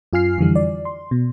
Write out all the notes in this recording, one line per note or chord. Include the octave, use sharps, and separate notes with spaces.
F#2 F4 G#5 F6 C7
F2 D3 E3 G3
D5
C6
B2